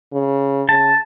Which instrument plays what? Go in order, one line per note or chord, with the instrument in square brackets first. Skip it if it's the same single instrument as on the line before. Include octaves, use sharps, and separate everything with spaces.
[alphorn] C#3
[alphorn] C#3 [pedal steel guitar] A5